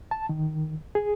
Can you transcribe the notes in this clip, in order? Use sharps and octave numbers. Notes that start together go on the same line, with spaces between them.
A5
D#3
G#4